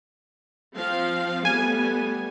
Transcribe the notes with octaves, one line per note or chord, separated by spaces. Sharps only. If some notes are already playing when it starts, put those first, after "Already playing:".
F3 C4 F5
G3 A3 B3 G#5